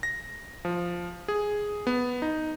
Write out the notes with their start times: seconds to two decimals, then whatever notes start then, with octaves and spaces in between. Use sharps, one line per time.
0.03 A#6
0.65 F3
1.28 G#4
1.87 B3
2.22 D#4